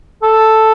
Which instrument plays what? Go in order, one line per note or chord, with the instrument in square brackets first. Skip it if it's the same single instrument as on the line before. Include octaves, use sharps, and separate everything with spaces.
[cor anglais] A4